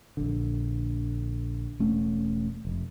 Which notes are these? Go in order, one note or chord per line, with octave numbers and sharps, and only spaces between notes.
A#1 D3
E1 A3 C#4
F1